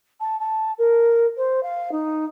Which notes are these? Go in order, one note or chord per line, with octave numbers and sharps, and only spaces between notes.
A5
A5
A#4
C5
F5
D#4